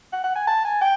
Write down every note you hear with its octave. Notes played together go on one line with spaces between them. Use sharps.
F#5
F#5
G#5
A5
G#5
G5